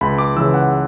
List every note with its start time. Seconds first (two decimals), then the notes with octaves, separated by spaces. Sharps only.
0.01 C#2 B5
0.18 D6
0.36 C#3 E3 E6
0.54 F#5